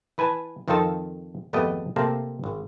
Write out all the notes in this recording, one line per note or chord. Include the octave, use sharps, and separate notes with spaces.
E3 B4 G#5 A5
F2 D#3 C4 F4 A4 A5
G#1 F2 A3 B3 G4 D#5
C3 A3 A#3 C4 A5
G#1